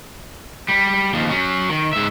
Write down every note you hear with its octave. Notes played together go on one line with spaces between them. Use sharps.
G3
D#2 F3
F#3 C#4
D#3
G#2 E5